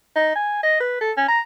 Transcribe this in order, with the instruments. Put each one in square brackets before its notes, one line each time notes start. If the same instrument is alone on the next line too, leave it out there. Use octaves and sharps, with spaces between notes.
[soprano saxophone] D#4
G#5
D#5
B4
A4
C#4
A#5